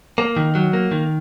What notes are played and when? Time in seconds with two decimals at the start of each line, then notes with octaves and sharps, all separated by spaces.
0.18 A#3
0.36 D#3
0.55 F#3
0.73 A#3
0.91 D#3